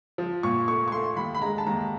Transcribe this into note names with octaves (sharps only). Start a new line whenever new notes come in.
F3
A#2 C#6
A3 C#6
C#6
A3 C6
D#2 B5
B5
G#3 A#5
A5
D#2 A#5